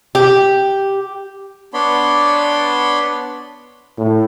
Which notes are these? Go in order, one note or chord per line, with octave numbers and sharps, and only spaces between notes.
G4
B3 D4 C#5 D5 B5 C6
A2